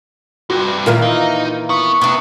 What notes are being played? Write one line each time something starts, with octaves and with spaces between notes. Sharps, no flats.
G2 C3 F#4
A#2 D#3 E3 F4 A#4 F5
D#4
B3 C#6
C3 E3 B3 D4